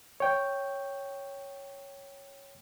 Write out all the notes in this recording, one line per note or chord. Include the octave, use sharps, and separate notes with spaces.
C#5 G5